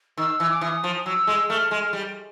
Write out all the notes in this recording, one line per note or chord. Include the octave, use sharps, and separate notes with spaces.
D#3 E6
E3
D6
E3 D#6
F3
F#3 E6
G#3
A3 F6
G#3
G3